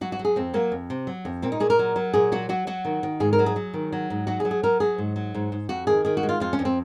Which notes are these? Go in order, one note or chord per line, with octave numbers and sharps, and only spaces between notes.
F#3 F#4
F#4
F#3
G#4
F2 C4
F#3 A#3
F2
C3
F#3
F2
A#2 C4
D#4
A#2 G#4
A#4
F#3
F#3
A#2 G#4
F#3 F#4
F#3 F#4
F#3 F#4
D#3
D#3
G#2 G#4
A#4
F#3
G#4
F#3
D#3
F#3
G#2
F#3 F#4
G#4
F#3
G#4
F#3 A#4
F#3 G#4
G#2
F#3
G#2
G#2
F2 F#4
D#3 G#4
D#3 G#4
F#4
G#3
F4
F2 F4
C#4
F2
C4